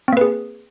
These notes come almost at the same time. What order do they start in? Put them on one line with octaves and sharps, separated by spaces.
C4 A#3 B4 G#4